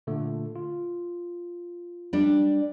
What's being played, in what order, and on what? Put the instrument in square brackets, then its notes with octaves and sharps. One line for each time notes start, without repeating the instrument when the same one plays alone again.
[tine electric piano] A#2 D3 A3
F4
[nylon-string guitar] G3 D4